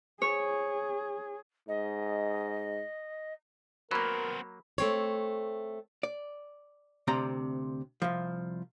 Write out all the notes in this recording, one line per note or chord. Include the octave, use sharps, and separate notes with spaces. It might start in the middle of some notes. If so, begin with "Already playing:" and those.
G#4 C#5
G#2 D#5
F#3 A#3 B3 A#4 C5 B5
A3 C4 C#5
D5
D2 C3 C4 D5 A#5
C2 F3